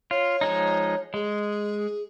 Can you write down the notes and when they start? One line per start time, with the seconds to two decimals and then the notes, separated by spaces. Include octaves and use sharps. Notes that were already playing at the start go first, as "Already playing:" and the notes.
0.11 F4 C#5
0.41 F3 G#3 D#4
1.14 G#3 G#4